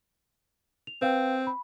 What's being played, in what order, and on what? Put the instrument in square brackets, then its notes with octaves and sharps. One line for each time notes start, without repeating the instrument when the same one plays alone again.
[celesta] F7
[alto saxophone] C4 [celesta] B4 F5 G5
[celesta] B5